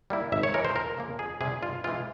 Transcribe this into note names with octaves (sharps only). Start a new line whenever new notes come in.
G3 A#3 E4
G#1 E5
C#5
G2 E3 G#3 A#4
C5
F2 A#4
C#3 F3 A#3
F2 G#4
C3 G3 G#4
G2 F4
E3 G#3 C4 F4